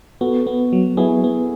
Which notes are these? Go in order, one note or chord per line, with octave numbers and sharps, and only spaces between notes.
B3 F#4 A4
B3
F#3
B3 E4 G#4
B3